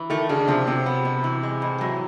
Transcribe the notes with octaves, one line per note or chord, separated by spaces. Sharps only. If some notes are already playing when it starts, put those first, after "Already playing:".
Already playing: E3
D#3 A3
C#3 D4
C3 F3
C3 F#3
B3
B2
E3
G#3
A2
E3 F#3